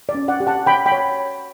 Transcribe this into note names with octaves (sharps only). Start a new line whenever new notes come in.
D5
C#4
D5 F#5
G4
F#5 A5
C#5 G5 B5
G5 B5
C#5